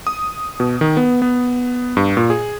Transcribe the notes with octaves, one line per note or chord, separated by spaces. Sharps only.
D#6
B2
D#3
B3
B3
G2
A#2
G#4